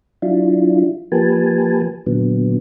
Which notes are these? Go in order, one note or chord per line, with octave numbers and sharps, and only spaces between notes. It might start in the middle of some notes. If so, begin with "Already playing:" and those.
F#3 D4 E4 F4
F3 A#3 G4 B4 G#5 A5
A#2 D3 F#3 B3